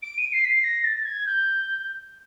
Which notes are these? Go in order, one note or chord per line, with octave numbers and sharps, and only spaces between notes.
D7
D#7
C7
B6
C7
A#6
A6
A6
G#6
G6